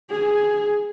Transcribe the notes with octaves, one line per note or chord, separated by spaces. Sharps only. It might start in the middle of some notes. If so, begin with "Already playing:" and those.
G#4